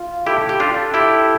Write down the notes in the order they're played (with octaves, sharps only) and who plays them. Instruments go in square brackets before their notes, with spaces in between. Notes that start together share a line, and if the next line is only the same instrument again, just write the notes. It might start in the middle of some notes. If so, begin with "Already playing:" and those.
Already playing: [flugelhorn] F4
[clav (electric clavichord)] E4 G4 [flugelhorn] A4
[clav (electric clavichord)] G4
D4 F4
E4 G4